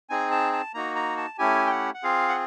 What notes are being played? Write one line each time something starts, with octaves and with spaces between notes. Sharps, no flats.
C4 D#4 G#4 G#5
A5
A5
A#3 D#4 F#4 A#5
A#5
A5
A3 C#4 E4 G4 G#5
G5
F#5
F#5
C4 F4 G#4 F5
F#5